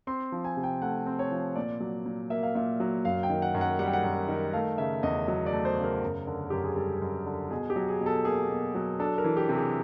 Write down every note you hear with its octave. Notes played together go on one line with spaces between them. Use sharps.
C4 C6
F3
G#5
C3
G5
A3 F#5
C4
C#5
F3
A#2 D5
F#3
A#2
A#3 E5
F5
A#2 E5
F#3
F#2 F5
G5
D#3
F#5
F#2
F#5
G3 F#5
G5
F#5
F#2
D#3
A3 F5
C#3 E5
E2 D#5
F#3 D#5
D5
A3
C5
C#3
A#4
F#2
D3
F#2 G4
G#4
G3 A4
F#2
D3
B2 G#4
G4
F#3
G#4
B2
A4
A#3 G#4
B2
F#3
D4 A4
A#4
E3
G4
C3
G#4